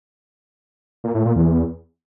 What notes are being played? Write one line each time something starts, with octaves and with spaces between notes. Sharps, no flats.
A#2
A2
A#2
E2